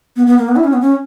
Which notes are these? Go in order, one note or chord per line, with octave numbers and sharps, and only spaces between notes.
B3
B3
A#3
B3
E4
C#4
B3
C#4